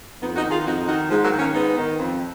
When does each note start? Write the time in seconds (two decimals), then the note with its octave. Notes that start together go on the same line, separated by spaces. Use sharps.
0.21 F2 B3 D#4
0.36 D#4 F#4
0.44 D#3
0.50 F4 G#4
0.65 F2 D#4 F#4
0.87 D#3 D#4 F#4
1.10 G#2 F3 G#3
1.24 F#3 A#3
1.32 D#3
1.39 A#3 C#4
1.54 G#2 B3 D#4
1.77 D#3
1.98 F2